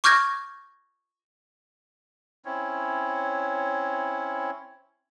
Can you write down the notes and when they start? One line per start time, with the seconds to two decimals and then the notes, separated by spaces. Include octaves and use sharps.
0.04 C#6 D6 F6 G6 G#6 A#6
2.45 C4 C#4 E4 C#5